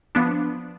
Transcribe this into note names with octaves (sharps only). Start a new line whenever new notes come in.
F3 B3 D4